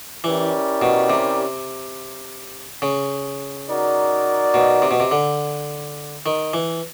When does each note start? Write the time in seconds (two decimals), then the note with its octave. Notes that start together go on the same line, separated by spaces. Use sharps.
0.24 E3 C#4 E4 G4 A#4 D5
0.82 B2
1.10 C3
2.82 C#3
3.68 D#4 F#4 A#4 D5
4.54 B2
4.82 C3
4.91 B2
5.00 C3
5.11 D3
6.26 D#3
6.53 E3